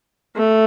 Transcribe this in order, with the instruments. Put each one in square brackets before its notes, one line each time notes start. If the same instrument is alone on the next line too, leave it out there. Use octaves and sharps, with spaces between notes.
[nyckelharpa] A3